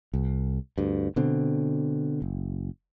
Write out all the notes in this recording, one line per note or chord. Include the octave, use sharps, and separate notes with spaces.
C2
D2 G2
B2 D3 C4
F#1